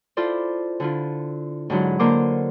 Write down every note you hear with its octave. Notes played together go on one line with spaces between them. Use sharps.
E4 F4 A4 C5 D5
D3 E4 F4
G#2 D3 F#3 E4
D3 A#3 A#4 C5 D6